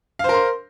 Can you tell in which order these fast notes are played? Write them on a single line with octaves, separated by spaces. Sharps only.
F5 C5 A#4 C6